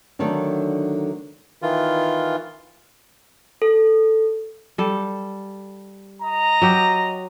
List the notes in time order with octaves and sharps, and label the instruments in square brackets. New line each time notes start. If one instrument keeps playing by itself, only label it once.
[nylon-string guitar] D3 D#3 F#3 A3 D4 D#4
[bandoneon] D#3 E3 F4
[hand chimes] A4
[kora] G3 A4
[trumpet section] D#5 A#5
[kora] F#3 G4